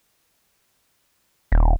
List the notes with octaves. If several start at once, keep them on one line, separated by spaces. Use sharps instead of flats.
D#1